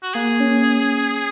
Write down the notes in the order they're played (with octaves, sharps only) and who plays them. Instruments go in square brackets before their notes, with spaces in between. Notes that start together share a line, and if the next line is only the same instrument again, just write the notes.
[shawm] F#4
[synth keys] A#3 [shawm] G#4
[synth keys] C#4